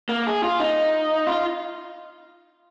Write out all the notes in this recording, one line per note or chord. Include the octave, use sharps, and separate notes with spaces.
A#3
G#4
F4
D#4
F4